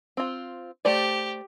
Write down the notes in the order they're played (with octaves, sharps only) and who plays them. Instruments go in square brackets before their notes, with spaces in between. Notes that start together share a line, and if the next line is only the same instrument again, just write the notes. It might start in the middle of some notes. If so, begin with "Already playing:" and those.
[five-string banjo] C4 F4
[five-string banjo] A3 C5 D5 [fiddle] G4